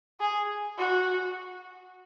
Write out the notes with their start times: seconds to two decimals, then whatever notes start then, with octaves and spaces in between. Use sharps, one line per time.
0.20 G#4
0.78 F#4